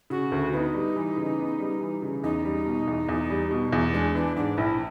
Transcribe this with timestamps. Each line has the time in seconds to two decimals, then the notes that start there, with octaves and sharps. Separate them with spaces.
0.10 C#3 F#4
0.32 D2
0.53 B3 D#4 E4
0.74 G3
0.96 E3
1.17 C#3
1.38 B3
1.60 G3
1.81 E3
2.02 C#3
2.24 E2 D#4
2.45 G3
2.66 B2
2.88 E2
3.09 E2
3.30 G3
3.51 B2
3.73 E2
3.94 G#3 D4
4.15 E3 D4
4.37 G#2 D4
4.57 A#1 E4